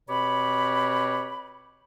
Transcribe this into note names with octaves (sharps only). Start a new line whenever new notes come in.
B2 C4 G4 B4 C#5 B5